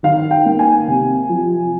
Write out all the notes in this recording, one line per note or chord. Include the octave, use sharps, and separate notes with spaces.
D#3 F5
G5
A#3
G#5
C3
F3